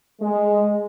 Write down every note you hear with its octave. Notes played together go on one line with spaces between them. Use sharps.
G#3